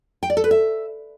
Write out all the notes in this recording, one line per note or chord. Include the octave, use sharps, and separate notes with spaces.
G5
D5
A4
B4
E5